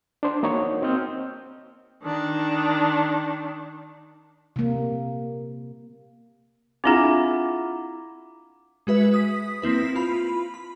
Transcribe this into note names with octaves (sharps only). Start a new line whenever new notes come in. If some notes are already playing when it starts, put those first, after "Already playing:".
D4 C5
A#3 D#4 F#4 C#5
C4 D#5 F6 G6
D#3 D4
C3 A#3
C4 D4 E4 F4 G#4 F#5 A#5 D6
G#3 F#4 B4 E5
D#6 B6
A#3 C4 E4 B4
F4 B5
B5